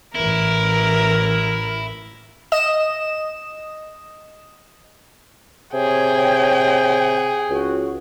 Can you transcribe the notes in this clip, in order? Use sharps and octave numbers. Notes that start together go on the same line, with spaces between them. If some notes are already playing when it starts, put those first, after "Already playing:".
A1 E3 E4 A#4
D#5 E7
C3 G#4 C#5 G5
C#2 F#4